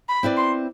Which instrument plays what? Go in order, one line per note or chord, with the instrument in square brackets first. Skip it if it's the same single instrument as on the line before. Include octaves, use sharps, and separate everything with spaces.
[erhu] B5
[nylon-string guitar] C4 E4 B4 D5
[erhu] C6